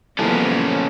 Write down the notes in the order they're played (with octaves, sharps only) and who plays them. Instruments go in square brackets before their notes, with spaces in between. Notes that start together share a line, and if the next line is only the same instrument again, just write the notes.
[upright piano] F#1 C2 [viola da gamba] C#3 F3 B3 [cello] A#3 [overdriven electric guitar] C#4 A4